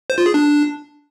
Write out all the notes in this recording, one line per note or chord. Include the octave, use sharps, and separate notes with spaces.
C5
F4
G#4
D4